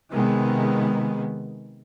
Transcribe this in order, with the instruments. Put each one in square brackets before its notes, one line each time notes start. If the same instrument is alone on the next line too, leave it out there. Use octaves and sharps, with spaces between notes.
[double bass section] C3 D#3 G#3 B3